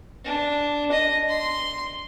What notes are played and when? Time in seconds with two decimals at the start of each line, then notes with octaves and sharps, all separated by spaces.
0.24 D4
0.92 D#5
1.29 C6